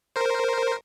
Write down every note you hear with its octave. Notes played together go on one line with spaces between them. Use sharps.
A#4 C5